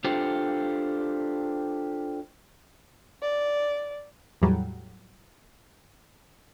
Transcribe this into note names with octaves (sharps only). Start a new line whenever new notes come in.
D4 F4 G4 A4 C5
D5
E2 A2 F#3 G3